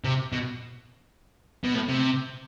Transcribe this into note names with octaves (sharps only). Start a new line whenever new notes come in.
C3
B2
B2
A2
C3